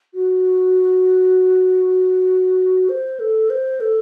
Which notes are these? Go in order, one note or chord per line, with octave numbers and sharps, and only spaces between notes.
F#4
C5
A4
C5
A4